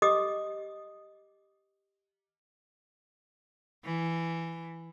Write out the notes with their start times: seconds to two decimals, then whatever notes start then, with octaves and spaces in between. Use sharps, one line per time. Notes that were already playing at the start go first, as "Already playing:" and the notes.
0.02 G4 D#5 D6 D#6
3.85 E3